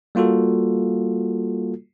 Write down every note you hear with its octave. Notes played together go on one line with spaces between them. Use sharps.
G3 A#3 F4 F#4 A4